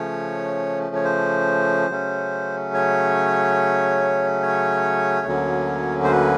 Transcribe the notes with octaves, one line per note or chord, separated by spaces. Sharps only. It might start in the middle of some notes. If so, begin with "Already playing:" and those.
Already playing: C#3 F3 A3 C#4 C#5
C#5
C5
C#3 F#3 A3 C#4
C#5
C#5
D2 D3 F#3 A#3 C#4
C5
B4